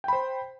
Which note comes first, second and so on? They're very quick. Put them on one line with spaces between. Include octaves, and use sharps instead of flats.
G5 B5 C5